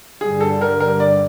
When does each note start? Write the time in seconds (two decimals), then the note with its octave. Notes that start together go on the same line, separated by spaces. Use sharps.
0.21 G2 D3 G3 G#4
0.41 A4
0.61 A#4
0.80 A#4
1.00 D5